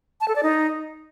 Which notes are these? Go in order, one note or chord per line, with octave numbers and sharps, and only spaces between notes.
A5
A4
D5
D#4